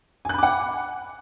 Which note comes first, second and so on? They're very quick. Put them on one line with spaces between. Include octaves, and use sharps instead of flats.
G#5 F#6 B5 D6 F#5